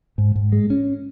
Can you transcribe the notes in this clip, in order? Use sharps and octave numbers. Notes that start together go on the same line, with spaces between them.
G#2
G#2
G#3
C#4